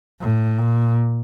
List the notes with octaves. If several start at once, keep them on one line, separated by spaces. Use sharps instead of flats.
A2
A#2